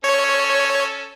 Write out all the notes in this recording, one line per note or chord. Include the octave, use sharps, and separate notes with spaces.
C#4 A4 C#5